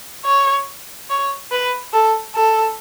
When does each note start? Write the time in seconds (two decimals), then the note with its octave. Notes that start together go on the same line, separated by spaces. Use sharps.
0.25 C#5
1.10 C#5
1.51 B4
1.93 A4
2.35 A4